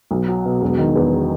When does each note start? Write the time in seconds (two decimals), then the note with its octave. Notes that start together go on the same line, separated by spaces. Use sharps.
0.11 B1
0.28 F#3
0.45 B2
0.62 E1
0.79 D#3
0.96 E2